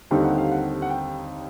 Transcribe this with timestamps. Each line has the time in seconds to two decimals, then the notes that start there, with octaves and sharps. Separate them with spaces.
0.11 D#2 D3 G3 C4 D#4 G5
0.24 F#5
0.38 F5
0.52 F#5
0.82 F#5
0.90 G5